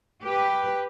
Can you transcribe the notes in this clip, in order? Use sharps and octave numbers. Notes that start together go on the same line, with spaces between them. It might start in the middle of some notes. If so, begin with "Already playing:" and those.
G4 B4